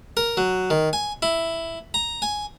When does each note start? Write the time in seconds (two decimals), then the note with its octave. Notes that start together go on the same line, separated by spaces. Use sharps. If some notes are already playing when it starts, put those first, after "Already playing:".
0.17 A#4
0.37 F#3
0.70 D#3
0.93 G#5
1.22 E4
1.94 A#5
2.22 G#5